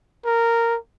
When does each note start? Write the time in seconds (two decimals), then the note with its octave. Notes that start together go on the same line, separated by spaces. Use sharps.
0.24 A#4